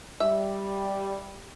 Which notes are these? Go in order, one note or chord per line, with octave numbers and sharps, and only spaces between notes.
G3 E5